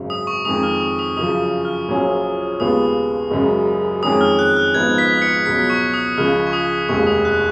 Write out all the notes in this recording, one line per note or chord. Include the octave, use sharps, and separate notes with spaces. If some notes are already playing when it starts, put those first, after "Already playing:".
Already playing: G#1 F#2 C#3
D#6
C#6
F2 D#3 G#3 D#6
F6
D#6
D#6
F#2 C#3 F3 D#6
F6
A#1 A#2 F#3 C#4 G#4
D#2 C#3 G#3 B3 F4 D#6
F#1 F#2 C#3 G#3
F2 D#3 G#3 C#4 G#4 D#6
F6
F#6
F6
G#1 G#2 F3 B3 D#4 G#6
B6
C#7
C#7
C#2 B2 F#3 B6
C#6
D#6
C#2 C#3 F3 F6
C#6
D#6
F1 D#2 C#3 G#3 C#6
D#6
F#6